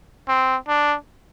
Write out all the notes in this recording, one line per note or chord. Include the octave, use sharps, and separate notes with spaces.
C4
D4